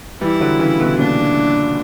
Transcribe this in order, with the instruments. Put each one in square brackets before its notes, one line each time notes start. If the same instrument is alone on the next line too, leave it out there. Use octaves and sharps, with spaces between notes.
[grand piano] E3 G3 [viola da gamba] E4
[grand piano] D3 F#3
C#3 E3
B2 D3
[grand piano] A#2 C#3 [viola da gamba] D4